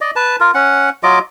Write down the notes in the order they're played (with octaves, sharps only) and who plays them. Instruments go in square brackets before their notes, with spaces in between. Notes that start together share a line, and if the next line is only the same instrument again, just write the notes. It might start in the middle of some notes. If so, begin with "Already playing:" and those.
[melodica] D5 D#5
B4 A5
F4 A#4
C#4 F#5
F#3 F4 D#5 D6